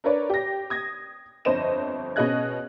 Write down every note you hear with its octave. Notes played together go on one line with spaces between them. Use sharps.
D4 A#4 B4 C#5 D5
G4 A#6
D#6 G#6 A#6
G1 F2 C5 C#5 D#5 E7
B2 C#4 G#4 D#5 F#6 G#6